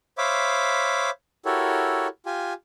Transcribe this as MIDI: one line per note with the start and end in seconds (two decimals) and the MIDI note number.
0.18 1.10 72
0.18 1.10 73
0.18 1.10 76
0.18 1.10 77
0.18 1.10 83
0.18 1.10 86
1.45 2.07 64
1.45 2.07 66
1.45 2.07 67
1.45 2.07 69
1.45 2.07 70
1.45 2.07 73
2.26 2.53 65
2.26 2.53 67
2.26 2.53 80